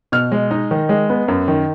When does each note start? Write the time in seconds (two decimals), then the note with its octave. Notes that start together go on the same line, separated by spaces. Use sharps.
0.12 B2 F6
0.32 G#3
0.51 D#4
0.71 D#3
0.89 G#3
1.10 B3
1.28 F#2
1.48 D#3